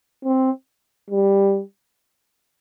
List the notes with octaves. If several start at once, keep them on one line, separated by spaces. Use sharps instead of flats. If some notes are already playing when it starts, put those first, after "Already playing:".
C4
G3